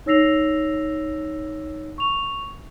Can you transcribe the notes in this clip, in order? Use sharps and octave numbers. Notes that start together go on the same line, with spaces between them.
D#4 C#5 E6 A#6 C7 F7
C#6 F7